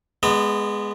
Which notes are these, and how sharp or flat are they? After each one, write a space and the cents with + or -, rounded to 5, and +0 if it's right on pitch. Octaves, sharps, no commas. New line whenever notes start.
G#3 +0 B3 +0 D#5 -45